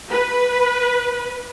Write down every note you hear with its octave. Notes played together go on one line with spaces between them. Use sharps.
B4